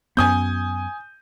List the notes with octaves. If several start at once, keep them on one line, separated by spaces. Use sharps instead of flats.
F#2 B3 G#5 D#6 G6